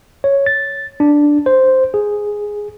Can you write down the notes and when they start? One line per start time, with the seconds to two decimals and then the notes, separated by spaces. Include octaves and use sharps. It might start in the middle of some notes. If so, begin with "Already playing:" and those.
0.24 C#5
0.46 A6
1.00 D4
1.46 C5
1.94 G#4